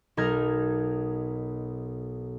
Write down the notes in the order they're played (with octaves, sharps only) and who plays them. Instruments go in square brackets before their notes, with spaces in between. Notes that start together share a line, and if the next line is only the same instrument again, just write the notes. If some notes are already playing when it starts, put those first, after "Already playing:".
[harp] B1 D#4 A#4 G#6